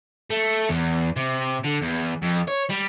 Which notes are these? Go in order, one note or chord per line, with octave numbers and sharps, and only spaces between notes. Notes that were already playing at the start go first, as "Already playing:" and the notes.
A3
E2
C3
D3
E2
F2
C#5
G3